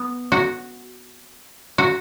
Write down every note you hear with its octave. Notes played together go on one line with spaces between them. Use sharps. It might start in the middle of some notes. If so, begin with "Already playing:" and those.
Already playing: B3
F#4
F#4